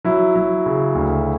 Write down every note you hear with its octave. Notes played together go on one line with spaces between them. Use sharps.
F#3 E4
F#3
C#3
D2